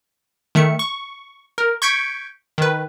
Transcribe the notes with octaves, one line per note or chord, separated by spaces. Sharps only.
D#3 A3 E5 C#7
C#6
A#4
C#6 G6 G#6 B6 C#7 D7
D#3 B4